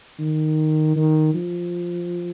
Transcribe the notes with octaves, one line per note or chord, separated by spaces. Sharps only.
D#3
D#3
F3